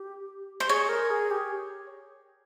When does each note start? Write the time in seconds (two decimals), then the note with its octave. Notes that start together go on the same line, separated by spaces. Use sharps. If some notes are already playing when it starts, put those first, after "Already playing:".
Already playing: G4
0.60 C5
0.68 G#4 C#5
0.89 A#4
1.10 G#4
1.31 G4